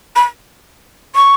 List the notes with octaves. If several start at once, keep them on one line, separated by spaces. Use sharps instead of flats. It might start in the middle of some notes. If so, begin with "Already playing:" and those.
B5
C#6